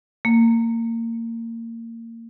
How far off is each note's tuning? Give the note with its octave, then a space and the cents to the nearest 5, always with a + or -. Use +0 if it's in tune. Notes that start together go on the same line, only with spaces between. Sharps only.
A#3 -25